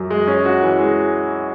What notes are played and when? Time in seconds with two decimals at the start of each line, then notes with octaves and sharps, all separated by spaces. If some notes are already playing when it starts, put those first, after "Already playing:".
Already playing: F#2
0.10 G#3
0.28 C#4
0.45 F#4
0.63 E3
0.79 G#3